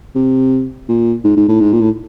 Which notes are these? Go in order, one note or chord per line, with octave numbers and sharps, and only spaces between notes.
C3
A#2
G#2
G#2
A2
G#2
A#2
A2